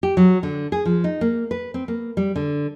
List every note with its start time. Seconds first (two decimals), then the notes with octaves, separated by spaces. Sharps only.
0.03 G4
0.17 F#3
0.43 D3
0.72 G#4
0.85 F3
1.04 D#4
1.21 A#3
1.51 B4
1.74 C4
1.88 A#3
2.17 G3
2.36 D3